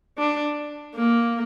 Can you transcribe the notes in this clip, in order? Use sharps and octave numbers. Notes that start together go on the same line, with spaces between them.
D4
A#3